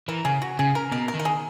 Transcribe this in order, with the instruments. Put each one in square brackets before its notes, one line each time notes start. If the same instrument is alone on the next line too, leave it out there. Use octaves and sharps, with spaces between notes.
[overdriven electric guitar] E3 [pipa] A#4
[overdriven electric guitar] C#3 [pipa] G#4
[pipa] F#4
[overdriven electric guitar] C#3 [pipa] G#4
[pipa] A#4
[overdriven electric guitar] B2 [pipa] A#4
[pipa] A#4
[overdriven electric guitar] D#3
[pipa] A#4
G#4